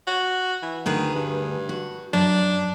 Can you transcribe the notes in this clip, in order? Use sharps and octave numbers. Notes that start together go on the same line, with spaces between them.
F#4
E3
D2 D#3 G#4 B4
G2
F#4
F#2 D4